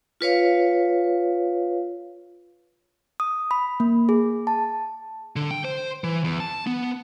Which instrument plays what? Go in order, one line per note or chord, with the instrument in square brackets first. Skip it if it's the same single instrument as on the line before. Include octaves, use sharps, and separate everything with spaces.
[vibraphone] F4 B4 C#5 F5
[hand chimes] D#6
B5
A#3
G#4
A5
[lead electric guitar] D3
G5
C5
E3
E2
A5
B3